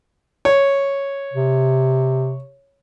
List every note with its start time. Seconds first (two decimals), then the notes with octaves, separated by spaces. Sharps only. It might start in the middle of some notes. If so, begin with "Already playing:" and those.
0.45 C#5
1.33 C3